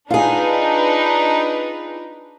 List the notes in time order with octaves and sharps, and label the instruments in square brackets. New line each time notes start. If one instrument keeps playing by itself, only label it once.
[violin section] D4 D#4 B4 [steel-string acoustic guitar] F4 G#4